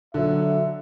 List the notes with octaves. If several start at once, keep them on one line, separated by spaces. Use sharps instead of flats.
D3 F#3 E5